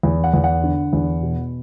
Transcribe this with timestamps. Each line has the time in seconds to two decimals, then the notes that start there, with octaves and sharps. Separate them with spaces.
0.03 E2
0.24 F#5
0.34 E2
0.44 F#5
0.64 D3
0.93 E2
1.23 B2